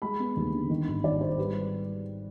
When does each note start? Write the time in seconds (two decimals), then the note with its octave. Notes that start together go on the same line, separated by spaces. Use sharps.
0.02 G#3 B5
0.20 B3
0.37 D#2
0.53 D3
0.69 D#3
0.88 G#1
1.04 G#1 D5
1.21 G#2 C5
1.37 G3 B4